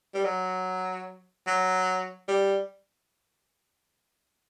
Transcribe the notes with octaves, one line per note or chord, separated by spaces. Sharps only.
G3
F#3
F#3
G3